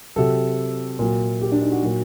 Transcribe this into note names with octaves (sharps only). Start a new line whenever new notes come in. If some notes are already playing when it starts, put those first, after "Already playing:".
C3 F#3 A4
A#2 F#3
G4
D4
D#4
F#4
A#2 F#3